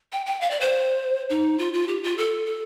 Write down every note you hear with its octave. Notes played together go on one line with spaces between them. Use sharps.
G5
G5
F5
D5
C5
D#4
F4
F4
G4
F4
A4
A4